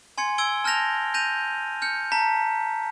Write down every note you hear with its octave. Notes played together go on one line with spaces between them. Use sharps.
G#5 C6 G#6 C#7
E6 G#6 D7 G7
A5 F6 G6 A#6 F7
G6 A#6 D#7 F7
F6 G6 C#7
A5 A#5 B6